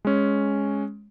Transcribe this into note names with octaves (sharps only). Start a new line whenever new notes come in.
G#3 C#4